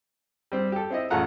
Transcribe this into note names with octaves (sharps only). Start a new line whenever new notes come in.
G3 C4
G4 A4
C4 E4 D#5
A1 A3 F4 F#5 A#5